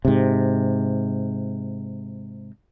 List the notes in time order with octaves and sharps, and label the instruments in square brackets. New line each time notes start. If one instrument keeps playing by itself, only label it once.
[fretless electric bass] G#2 C3